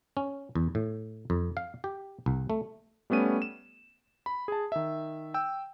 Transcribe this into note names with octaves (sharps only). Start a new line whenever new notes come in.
C#4
E2
A2
F2
F5
G4
C2
A3
G3 A3 B3 C#4 D#7
E7
B5
G#4 A5
D#3 E5
G5 E6